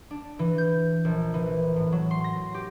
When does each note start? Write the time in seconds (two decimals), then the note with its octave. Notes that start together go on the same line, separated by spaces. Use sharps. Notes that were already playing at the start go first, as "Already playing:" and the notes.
0.11 D4
0.39 E3
0.58 G6
1.05 A#1
1.34 E3
1.76 A2
1.92 F#3
2.11 C6
2.24 A#6
2.54 G4